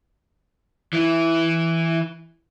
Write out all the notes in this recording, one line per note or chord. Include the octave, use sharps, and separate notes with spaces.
E3 E4